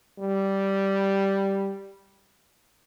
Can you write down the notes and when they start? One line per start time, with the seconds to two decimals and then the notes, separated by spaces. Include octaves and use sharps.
0.18 G3